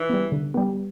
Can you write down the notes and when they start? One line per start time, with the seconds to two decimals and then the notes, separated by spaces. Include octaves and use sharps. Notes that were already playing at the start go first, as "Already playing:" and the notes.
Already playing: E3
0.10 G3 B3
0.32 D3
0.54 G3 B3